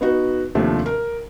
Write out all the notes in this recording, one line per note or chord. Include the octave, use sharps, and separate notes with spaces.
B3 D#4 F#4
D#2 C3 F3 A3 D4
A#4